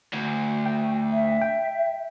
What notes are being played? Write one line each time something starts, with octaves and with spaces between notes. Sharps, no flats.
D2
G5
E5
G5